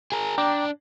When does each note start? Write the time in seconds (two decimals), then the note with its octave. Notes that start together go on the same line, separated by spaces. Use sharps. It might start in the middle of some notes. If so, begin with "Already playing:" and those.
0.12 G#4 A#4
0.38 D4 G5 A#5 D6